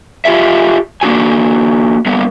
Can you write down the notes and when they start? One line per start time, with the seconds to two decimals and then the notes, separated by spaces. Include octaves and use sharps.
0.25 F4 G4 G#4 E5
1.01 A#3 D4 F#4 G#5
2.06 G3 A#3 B3